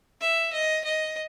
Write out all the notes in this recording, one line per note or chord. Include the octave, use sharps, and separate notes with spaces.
E5
D#5
D#5